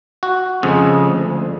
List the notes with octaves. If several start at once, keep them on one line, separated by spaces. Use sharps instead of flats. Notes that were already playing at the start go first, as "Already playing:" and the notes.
F#4
F2 C#3 G#3
D2